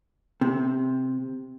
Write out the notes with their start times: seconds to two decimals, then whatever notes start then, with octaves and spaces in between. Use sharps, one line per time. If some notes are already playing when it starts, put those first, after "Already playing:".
0.41 C3